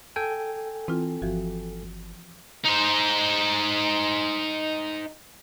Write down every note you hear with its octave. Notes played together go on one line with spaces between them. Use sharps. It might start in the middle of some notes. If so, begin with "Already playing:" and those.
A4 G5 G#5
E3 C4 F4
G1 E3 F3 F#4
D#4 C5